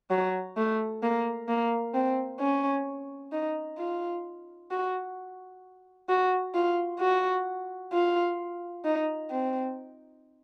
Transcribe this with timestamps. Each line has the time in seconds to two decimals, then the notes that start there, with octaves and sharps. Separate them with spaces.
0.11 F#3
0.57 A3
1.03 A#3
1.48 A#3
1.94 C4
2.40 C#4
3.33 D#4
3.79 F4
4.71 F#4
6.09 F#4
6.55 F4
7.00 F#4
7.93 F4
8.85 D#4
9.31 C4